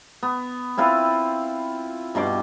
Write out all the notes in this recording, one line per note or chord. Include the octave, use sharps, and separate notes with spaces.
B3
C4 E4 F4 B4
G2 B2 C6 D6